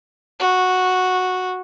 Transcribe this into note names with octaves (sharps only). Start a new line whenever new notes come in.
F#4